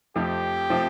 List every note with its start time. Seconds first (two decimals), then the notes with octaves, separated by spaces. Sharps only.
0.16 F2 C3 F3 A3 C4 G4
0.70 C3 F3 A3 C4